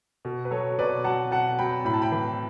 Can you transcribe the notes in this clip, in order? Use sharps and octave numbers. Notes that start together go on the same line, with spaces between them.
B2
B4
F#3 A4 C#5
B2 B4 D5
F#3 F#5 A5
B2 F#5 A5
F#3 G5 B5
A2 B5
A5
G5 B5
E3